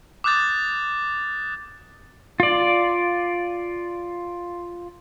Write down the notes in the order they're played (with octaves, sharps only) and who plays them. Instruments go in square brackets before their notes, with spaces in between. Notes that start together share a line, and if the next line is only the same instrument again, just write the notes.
[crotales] D6 D#6 F#6 G6 A6
[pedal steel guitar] F4 D5